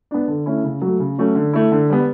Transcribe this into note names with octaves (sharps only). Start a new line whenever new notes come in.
B3 D4
D3
A3 C#4 E4
C#3
F#3
A3
C#3
F#3 A3 C#4 F#4
D3
A3 E4
D3
G3 B3